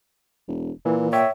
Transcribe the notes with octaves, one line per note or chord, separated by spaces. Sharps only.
E1
A#2 E3
C#5 E5 G5